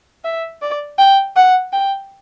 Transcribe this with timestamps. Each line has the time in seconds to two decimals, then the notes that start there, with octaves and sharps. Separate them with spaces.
0.25 E5
0.62 D5
0.99 G5
1.36 F#5
1.73 G5